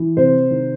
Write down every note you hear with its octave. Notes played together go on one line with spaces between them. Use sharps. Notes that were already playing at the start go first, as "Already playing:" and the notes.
Already playing: E3
C3 C5
D#3